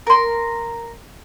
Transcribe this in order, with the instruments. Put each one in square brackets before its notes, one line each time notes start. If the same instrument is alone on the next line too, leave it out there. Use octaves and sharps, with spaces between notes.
[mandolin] A#4 C6